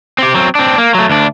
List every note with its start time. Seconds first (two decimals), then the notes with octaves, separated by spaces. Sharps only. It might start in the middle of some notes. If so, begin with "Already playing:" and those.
0.18 C4 G4
0.34 F#3 C4
0.55 C4 D4
0.78 A#3
0.95 F#3 A3
1.10 D2 D4